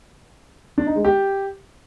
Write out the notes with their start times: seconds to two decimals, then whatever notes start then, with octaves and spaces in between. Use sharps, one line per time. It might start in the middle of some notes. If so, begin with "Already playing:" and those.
0.78 D4
0.87 D#4
0.96 G#3
1.05 G4